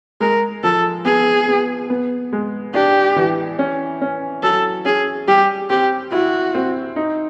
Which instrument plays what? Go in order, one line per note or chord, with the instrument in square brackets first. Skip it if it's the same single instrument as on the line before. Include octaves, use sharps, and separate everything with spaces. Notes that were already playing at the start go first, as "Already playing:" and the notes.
[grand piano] G#3 [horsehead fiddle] A#4
[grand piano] F3 [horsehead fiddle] A4
[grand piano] B3 [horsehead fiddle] G#4
[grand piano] B3
B3
G#3
[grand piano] D4 [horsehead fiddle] G4
[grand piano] E3
C#4
C#4
[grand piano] F#3 [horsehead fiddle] A4
[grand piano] C#4 [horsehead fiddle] G#4
[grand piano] G3 [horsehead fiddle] G4
[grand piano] C4 [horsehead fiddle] G4
[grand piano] E4 [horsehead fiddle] F#4
[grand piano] C4
D#4